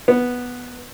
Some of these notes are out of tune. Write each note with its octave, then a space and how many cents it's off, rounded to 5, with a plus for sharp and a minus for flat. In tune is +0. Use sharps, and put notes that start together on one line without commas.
B3 -5